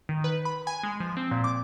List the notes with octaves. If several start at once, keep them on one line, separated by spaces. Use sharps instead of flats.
D#3
B4
B5
G#5
G#3
F3
C4
A#2
D6